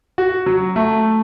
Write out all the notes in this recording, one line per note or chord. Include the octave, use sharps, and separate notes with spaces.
F#4
F#3
A3